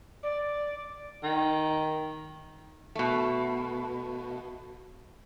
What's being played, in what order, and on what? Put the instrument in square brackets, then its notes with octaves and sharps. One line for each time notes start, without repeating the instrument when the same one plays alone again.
[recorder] D5
[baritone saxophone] D#3
[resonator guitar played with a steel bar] B2 A3